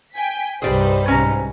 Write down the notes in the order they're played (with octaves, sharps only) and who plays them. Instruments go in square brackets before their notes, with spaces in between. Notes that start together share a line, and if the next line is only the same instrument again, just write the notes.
[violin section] G5 G#5 B6
[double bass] C2 G2 [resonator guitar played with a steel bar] G3 G#4 [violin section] D#4 B4 C5
[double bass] C2 G#2 [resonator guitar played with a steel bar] C#4 A#5